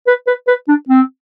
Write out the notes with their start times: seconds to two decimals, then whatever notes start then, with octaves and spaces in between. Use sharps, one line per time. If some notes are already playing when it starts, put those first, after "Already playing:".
0.07 B4
0.27 B4
0.48 B4
0.68 D4
0.89 C4